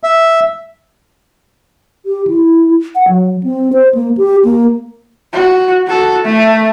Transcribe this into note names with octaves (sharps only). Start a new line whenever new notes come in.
E5
G4
E4
F#5
F#3
C4
C5
A#3
G4
A#3
F#4
F#4 A4
A3